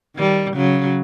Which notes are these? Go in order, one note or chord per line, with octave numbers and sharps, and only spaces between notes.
D#3 G3
C#3 F#3